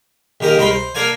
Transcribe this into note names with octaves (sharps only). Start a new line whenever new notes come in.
A#1 D#3 G4 A#4 D#6
C2 G#2 C3 A#4 B5 C6
C5
A#3 D4 A#4 D5 F5 G#5